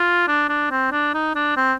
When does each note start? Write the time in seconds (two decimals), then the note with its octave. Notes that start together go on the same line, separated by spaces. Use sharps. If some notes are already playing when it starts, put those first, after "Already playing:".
Already playing: F4
0.28 D4
0.49 D4
0.71 C4
0.92 D4
1.14 D#4
1.35 D4
1.57 C4